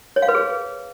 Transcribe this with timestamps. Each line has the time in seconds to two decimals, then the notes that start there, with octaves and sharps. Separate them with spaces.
0.16 C#5
0.22 F5
0.29 B4
0.35 G#4